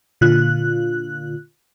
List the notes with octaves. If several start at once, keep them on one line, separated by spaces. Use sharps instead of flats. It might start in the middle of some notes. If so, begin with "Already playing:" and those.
A#2 D3 F4 F#6